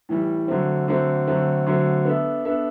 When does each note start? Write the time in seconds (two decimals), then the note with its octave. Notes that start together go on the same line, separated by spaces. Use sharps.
0.09 A2 E3 G3
0.48 D3 F#3 A3 C4
0.88 D3 F#3 A3 C4
1.27 D3 F#3 A3 C4
1.66 D3 F#3 A3 C4
2.05 B3 D4 A4 E5
2.45 B3 D4 A4 E5